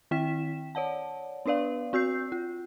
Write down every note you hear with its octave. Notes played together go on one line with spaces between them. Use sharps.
D#3 C4 E4 G5 B6 E7
C#5 D5 F#5 A5
B3 D4 B4 D5 F5
C4 F#4 E6 G6 C7
F4